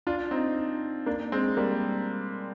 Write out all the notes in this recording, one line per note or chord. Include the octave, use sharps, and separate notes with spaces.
D4 F4
C4 D#4
A#3 D4
G#3 C4
G3 A#3